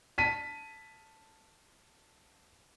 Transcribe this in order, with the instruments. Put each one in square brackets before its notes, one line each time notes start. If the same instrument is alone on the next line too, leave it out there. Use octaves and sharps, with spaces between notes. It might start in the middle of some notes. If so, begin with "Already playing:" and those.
[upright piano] A5 B6 D#7